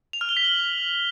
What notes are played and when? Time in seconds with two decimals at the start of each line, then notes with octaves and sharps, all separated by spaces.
0.13 F7
0.21 F6
0.29 G7
0.37 B6
0.44 F#7